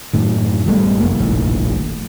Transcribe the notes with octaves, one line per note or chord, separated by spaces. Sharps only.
F#2 A2 D#3
A1 G3 A3 B3
F1 F#2 A#3
F1 A#1 D#2 A2